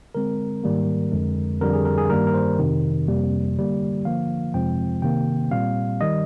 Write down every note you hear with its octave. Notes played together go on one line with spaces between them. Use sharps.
D3 G#3 C4 A#4
G#2 D#3 G3 A#3
F2 D3 G#3
F2 D3 G3 A#4
G#4
A#4
G#4
G2 D#3 G3 A#3 A#4
A#4
C5
F2 C3 D#3
F2 C3 G3 A#3
D3 G3 A#3
D3 F3 A#3 F5
F2 C3 F3 G#3 C4 G5
C3 D#3 A#3 G5
A#2 G3 C4 F5
D#3 G3 D#5